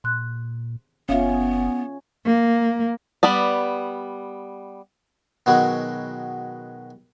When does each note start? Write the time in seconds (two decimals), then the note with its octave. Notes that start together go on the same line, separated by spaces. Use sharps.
0.04 A#2 C6 F#6
1.09 F#1 B3 C#4 F4 E5 F5
2.26 A#3
3.23 G3 B3 D5
5.46 B2 D#3 F#3 G#3 B3